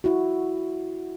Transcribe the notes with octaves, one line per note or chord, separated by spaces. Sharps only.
E4 F#4